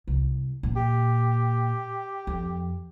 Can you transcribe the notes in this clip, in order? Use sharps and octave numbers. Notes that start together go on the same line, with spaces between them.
C2
A#2
G4
F2